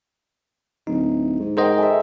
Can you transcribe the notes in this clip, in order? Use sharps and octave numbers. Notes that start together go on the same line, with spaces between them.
D1 D#4
G#2
G#4 A#4 C5 D#5 F#5 G5
G#3 A4 E5